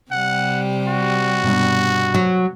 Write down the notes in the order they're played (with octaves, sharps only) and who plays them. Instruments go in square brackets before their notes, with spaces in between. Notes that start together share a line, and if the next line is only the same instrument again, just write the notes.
[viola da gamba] C3 G3 [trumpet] F#5
[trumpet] F#4
[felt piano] G2 B2
[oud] F#3